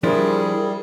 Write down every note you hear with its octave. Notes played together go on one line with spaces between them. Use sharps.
F3 G3 D4 E4 G#4 A#4